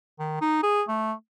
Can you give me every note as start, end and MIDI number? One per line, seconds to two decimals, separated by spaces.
0.19 0.39 51
0.41 0.61 63
0.63 0.82 68
0.88 1.13 57